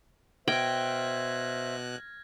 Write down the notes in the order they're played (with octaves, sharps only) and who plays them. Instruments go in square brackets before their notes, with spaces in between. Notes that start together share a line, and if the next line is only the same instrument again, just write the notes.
[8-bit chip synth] B2 F#6 [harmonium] C5 E5 [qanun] G5 [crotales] F6 G#6 A#6